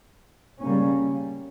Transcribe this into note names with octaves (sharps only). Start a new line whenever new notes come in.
C#3 G3 A#3 C#4